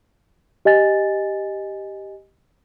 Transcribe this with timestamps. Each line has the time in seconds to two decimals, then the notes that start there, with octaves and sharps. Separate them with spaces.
0.65 G4 D#5 G#5 A6